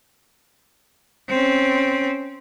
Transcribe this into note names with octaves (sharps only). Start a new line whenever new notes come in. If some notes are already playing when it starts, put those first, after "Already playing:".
C4 C#4